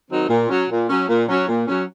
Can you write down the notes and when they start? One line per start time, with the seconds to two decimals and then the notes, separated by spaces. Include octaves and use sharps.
0.10 D#3 F#3 C4 D#4
0.29 A#2
0.49 F#3 C#4
0.69 A#2
0.89 F#3 C#4
1.09 A#2
1.28 F#3 C#4
1.48 A#2
1.68 F#3 C#4